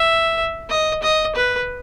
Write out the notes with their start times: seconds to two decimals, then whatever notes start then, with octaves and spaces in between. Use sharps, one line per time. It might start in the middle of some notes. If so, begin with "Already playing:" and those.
Already playing: E5
0.70 D#5
1.02 D#5
1.35 B4